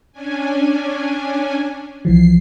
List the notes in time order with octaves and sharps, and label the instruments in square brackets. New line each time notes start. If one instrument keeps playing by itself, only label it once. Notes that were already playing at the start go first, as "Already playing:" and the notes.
[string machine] C#4 D4 G#5
[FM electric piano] C2 E3 F3 [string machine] C7